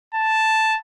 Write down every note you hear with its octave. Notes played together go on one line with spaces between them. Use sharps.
A5